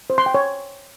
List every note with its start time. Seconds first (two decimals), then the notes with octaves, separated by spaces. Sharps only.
0.10 C5
0.18 C6
0.26 G5
0.35 C#5